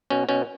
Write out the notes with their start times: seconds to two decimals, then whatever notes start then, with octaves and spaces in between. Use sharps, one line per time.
0.10 B2 C#4
0.29 B2 C#4